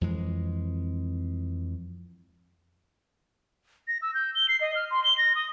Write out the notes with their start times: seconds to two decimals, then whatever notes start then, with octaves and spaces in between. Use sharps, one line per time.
0.01 F2 E3 G#3
3.88 A#6
4.02 E6
4.14 G6
4.35 G7
4.49 C7
4.61 D#5
4.75 F6
4.91 C6
5.04 G7
5.18 A#6
5.35 D#6